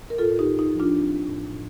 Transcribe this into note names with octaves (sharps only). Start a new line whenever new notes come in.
A#4
A2 F4 A4
F4
D#4 G4
A2
D#4
F3
D4 F4
C4
A2
A2